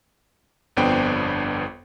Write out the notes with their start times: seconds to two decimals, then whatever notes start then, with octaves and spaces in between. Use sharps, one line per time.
0.77 G1 F2 B3 D4 C5 G5